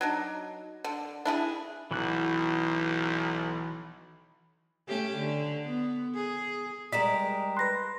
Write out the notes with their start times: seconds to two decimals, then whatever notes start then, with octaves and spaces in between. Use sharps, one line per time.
0.01 F#3 D4 D#4
0.84 D3
1.25 D4 E4 F4 G#4
1.91 B1 E3 F#4 F#6
4.89 A3 C#4 G4
5.17 D3
5.65 B3
6.15 G#4
6.92 G3 G#3 A#4 D#5 B6 E7
7.57 B4 C6 F#6 A#6